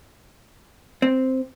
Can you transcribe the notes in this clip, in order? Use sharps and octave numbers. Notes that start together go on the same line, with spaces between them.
C4